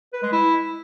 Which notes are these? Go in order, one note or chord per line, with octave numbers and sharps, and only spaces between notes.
B4
G#3
E4